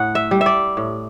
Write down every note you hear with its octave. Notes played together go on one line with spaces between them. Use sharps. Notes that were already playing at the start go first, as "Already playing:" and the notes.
Already playing: A2 F#5
E5
G3
E5
D5
A2